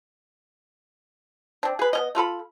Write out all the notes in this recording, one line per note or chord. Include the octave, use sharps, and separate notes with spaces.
C4 D4
G#4 B4
B3 C#4 D#5
A3 F4 A4 B5